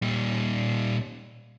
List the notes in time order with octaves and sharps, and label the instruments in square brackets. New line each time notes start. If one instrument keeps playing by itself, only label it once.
[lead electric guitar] A#2 G3